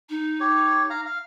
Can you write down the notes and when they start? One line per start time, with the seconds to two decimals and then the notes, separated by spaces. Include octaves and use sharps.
0.09 D#4
0.40 G4 C#5
0.90 F5 A#5
1.06 F5